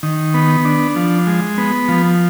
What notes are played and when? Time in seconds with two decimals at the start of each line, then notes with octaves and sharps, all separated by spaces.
0.03 D#3
0.34 B3
0.65 D4
0.96 F3
1.27 G#3
1.58 B3
1.89 F3